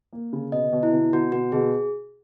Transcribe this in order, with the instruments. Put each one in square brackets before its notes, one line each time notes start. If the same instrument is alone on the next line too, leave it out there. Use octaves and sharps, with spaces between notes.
[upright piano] A#3
C#3
[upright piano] B2 [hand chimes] D#5
[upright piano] B2
[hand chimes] E4
[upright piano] B2
[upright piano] B2 [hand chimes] F#4
[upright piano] B2 [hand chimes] F#4
[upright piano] B2 [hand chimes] G#4